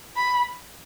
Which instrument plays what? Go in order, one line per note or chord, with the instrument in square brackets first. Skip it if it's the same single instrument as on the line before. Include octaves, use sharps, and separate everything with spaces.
[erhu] B5